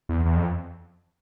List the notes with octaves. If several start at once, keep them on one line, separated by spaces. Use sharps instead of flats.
E2
E2
F2